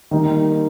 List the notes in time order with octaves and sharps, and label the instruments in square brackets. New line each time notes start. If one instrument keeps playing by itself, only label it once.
[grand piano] D#3 G3 A#3 D#4